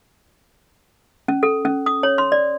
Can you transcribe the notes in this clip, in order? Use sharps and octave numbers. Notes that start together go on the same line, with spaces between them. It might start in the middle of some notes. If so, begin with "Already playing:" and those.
C#4
A4
C#4
D#6
C#5
C6
D5